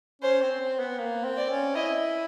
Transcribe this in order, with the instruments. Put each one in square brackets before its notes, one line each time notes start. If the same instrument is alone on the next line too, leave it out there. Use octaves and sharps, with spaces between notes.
[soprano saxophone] C#4 [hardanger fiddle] C5
[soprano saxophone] C4
C4
B3
A#3
C4
[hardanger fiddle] D5
[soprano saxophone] C#4
[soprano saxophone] E4 [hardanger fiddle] D#5